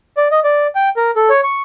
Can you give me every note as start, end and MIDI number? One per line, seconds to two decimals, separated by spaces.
0.17 0.28 74
0.31 0.40 75
0.44 0.67 74
0.75 0.89 79
0.97 1.11 70
1.16 1.29 69
1.30 1.41 73
1.44 1.62 85